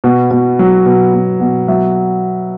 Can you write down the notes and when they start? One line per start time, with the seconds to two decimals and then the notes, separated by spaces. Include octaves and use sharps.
0.04 B2
0.31 B2
0.59 F#3
0.86 B2
1.14 B2
1.40 B2
1.68 F#3 E5